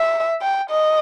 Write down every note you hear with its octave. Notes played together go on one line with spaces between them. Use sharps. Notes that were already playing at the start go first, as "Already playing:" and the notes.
Already playing: E5
G5
D#5